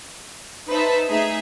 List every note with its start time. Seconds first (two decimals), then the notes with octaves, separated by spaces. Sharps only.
0.69 D#4 B4 C5 E5 A5
1.08 A3 D#4 G#4 E5